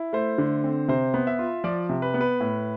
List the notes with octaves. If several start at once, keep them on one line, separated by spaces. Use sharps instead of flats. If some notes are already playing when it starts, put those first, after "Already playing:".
Already playing: E4
A3 C5
D3
C4
C3 C5
B3
E5
F4
F3 D5
C3
B4
B3
B4
A2